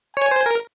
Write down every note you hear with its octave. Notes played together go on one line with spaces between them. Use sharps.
C#5 G#5
C5
A#4